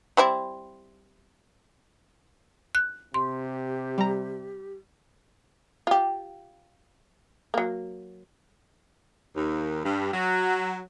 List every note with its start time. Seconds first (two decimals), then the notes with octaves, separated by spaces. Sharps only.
0.17 G3 C4 E4
2.75 F#6
3.14 C3 G4 C6
3.98 G3 A#5
5.87 F4 G4
7.54 F#3 A#3
9.36 D#2
9.84 G2
10.13 F#3